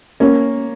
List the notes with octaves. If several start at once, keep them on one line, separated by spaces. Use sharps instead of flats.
A#3 C#4